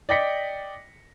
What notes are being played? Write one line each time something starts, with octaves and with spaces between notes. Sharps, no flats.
D5 D#5 G5 A#6 B6 C#7